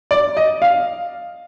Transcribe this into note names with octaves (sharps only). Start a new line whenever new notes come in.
D5
D#5
F5